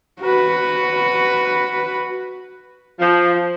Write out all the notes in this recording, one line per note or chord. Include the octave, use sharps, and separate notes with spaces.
F#4 B4
F3